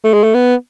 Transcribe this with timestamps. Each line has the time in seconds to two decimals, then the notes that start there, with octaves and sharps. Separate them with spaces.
0.04 A3
0.14 G#3
0.23 A3
0.34 B3